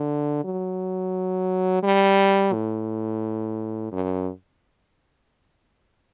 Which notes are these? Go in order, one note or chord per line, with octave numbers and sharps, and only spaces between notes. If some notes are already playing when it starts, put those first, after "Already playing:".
Already playing: D3
F#3
G3
A2
F#2